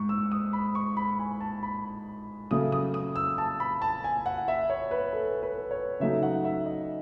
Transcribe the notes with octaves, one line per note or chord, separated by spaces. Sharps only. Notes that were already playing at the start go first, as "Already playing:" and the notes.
Already playing: G#2 C#6
E6
D#6
B5
C#6
B5
G#5
A5
B5
C#3 F#3 A3 D#6
D#6
D#6
E6
A5
B5
A5
G#5
F#5
E5
C#5
B4
A4
B4
C#5
C#3 F#3 A3 D#4 E5
F#5
E5
D#5